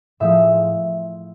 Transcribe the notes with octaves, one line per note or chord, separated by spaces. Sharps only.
A2 F3 G#3 E5